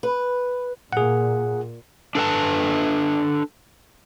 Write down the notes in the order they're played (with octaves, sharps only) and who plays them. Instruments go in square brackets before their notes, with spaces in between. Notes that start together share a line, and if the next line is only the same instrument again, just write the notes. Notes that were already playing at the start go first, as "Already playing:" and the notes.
[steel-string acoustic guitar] B4
[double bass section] A#2 [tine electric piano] G#4 F#5
[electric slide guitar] D4 A4 B4 A5